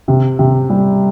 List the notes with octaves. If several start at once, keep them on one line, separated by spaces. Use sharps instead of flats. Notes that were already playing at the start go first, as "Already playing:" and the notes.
C3
C3
G3